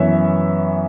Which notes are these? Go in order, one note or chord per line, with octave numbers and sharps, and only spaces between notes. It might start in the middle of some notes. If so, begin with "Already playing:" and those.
Already playing: F#2 E3 B3 B4 C#5 E5